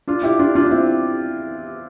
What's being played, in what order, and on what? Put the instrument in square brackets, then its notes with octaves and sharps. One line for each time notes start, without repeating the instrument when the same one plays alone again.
[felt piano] D4 F4
E4 G4
D4 F4
D4 F4
D4
C4 E4